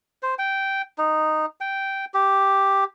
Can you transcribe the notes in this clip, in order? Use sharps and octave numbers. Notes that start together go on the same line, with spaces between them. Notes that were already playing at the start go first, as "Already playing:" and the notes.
C5
G5
D#4
G5
G4